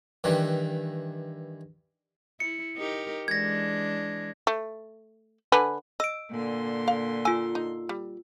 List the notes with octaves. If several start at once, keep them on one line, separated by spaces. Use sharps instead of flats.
G2 D#3 E3 G3
E4 C#7
D#4 G4 A#4
E3 G#3 D4 G#6 A#6
A3
D3 B4 G#5
D#5 E6 D7
A#2 D3 C6
F5
F4 G#5 E6
D#4
G3